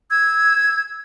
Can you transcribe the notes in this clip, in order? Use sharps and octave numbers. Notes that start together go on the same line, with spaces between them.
E6 G#6